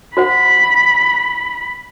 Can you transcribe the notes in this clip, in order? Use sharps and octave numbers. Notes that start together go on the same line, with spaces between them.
F#4 C5 F#5 B5